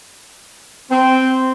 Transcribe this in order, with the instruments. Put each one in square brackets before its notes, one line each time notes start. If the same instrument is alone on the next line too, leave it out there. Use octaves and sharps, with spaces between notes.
[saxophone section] C4